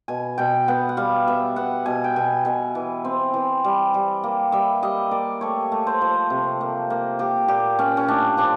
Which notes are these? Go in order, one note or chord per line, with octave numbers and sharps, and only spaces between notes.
B2 G#5
B2 G5
B3 F#5
F#5
G3 F5
B3 E5
B3 F#5
B2 G#5
G5
B2 G#5
B2 G#5
E3
C4
E3
G3
G3
A#3
G3 E5
G3 D#5
A#3 D5
A3 C#5
A3
C5
F3
C3
A#3
A#3
A#3 G4
A#2 G4
A#2 C#4
C#4
A2 D4
F3 D4